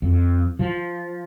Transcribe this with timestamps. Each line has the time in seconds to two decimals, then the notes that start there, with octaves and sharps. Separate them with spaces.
0.02 F2
0.59 F3